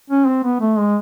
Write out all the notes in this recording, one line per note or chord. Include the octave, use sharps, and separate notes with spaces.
C#4
C4
B3
A3
G#3